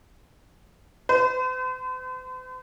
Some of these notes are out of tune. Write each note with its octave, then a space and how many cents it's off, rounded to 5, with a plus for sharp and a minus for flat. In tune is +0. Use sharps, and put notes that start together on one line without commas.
C5 -45